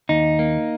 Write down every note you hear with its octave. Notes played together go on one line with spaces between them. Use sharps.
D#2 D#4
A#3